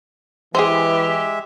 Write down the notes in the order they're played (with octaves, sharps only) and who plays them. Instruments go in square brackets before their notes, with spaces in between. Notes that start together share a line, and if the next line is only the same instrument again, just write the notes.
[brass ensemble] E3 [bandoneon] G#3 E5 [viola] G4 [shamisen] G#4 C5